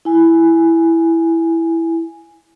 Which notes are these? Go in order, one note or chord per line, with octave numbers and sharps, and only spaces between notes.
E4 G#5